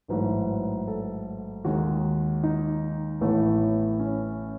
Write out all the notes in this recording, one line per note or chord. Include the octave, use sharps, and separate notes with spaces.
A1 G#2 F#3 A3 B4
A4
D#2 D#3 G#3 F#4
D#4
A1 A2 E3 A3 B3
C#4